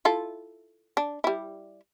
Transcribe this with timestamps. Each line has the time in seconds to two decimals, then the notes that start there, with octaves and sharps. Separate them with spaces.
0.05 E4 F4 A4
0.97 D4
1.24 G3 E4